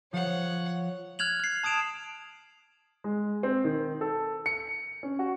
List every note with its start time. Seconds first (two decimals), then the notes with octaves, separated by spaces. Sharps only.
0.13 F3 C#5 F#5
1.19 F6 F#6 G#6 F7 F#7
1.39 F6 C7
1.64 A5 D#6 G#6 D7 E7 F7
3.04 G#3
3.43 C4
3.64 D#3
4.01 A4
4.46 C#7
5.03 C#4
5.19 F#4